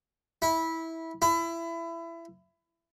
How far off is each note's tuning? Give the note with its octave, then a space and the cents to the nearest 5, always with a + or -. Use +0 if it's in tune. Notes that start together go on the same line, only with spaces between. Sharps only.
E4 -15
E4 +25